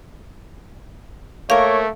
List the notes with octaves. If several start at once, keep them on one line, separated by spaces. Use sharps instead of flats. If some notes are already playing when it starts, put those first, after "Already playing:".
A3 A#3 A#4 C#5 F5